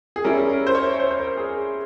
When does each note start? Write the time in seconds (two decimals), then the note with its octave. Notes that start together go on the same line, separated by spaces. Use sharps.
0.16 G#4
0.24 G3 C#4 E4 A#4
0.49 A#4
0.67 C5
0.75 C#5
0.95 C#5
1.00 C5
1.11 C5
1.19 A#4
1.37 G#4